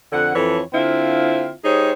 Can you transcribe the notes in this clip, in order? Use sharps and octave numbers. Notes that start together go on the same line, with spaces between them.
F2 D3 F#5
F2 E3 A4 C#5
D3 C4 E4 F4 F5
G3 D#4 G#4 C5 C#5